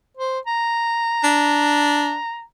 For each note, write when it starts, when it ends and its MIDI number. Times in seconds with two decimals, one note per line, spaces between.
0.17 0.39 72
0.47 2.43 82
1.24 2.16 62